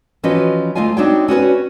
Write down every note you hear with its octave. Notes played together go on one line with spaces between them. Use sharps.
E3 F3 C#4 F#4 B4 D#5
D2 A3 F4 D#5 F5 G#5
C4 D4 D#4 F#4 C#5 G5
C#4 F#4 B4 C#5